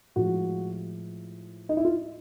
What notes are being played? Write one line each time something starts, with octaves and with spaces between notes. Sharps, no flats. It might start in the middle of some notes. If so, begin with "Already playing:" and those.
A2 F3 G#3 F#4
D#4
E4
F4